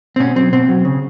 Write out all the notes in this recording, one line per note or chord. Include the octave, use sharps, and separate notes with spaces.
C4
B2 C#4
F#3 C4
B2 C4
F#3
C#3